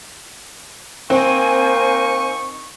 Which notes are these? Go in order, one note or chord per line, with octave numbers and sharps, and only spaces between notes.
A#3 C4 D#4 C5 G#5 C#6